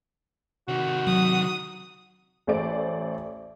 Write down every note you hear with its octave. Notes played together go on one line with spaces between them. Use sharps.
C3 D#3 F#4
F#3 D#6
A1 A3 C5 D5 D7